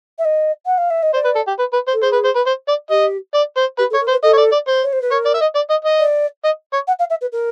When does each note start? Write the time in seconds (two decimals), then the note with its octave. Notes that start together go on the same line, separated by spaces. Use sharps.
0.19 E5
0.25 D#5
0.66 F#5
0.78 F5
0.90 E5
1.03 D#5
1.14 C5 D5
1.24 B4
1.35 A4
1.47 G4
1.59 B4
1.73 B4
1.88 C5
1.93 A4
2.03 G#4 C5
2.13 B4
2.25 C5
2.35 B4
2.46 C5
2.68 D5
2.90 G4 D#5
3.34 D5
3.57 C5
3.78 G4 B4
3.90 A4
3.94 C#5
4.01 A#4
4.08 C5
4.11 B4
4.23 A4 D#5
4.33 C#5
4.37 D5
4.52 D5
4.68 C5
4.83 C#5
4.93 C5
5.02 B4
5.11 A#4 C#5
5.25 D5
5.34 E5
5.41 D#5
5.55 D5
5.70 D#5
5.84 D#5
6.00 D5
6.44 D#5
6.73 C#5
6.87 F#5
6.99 F5
7.10 E5
7.21 B4
7.32 A#4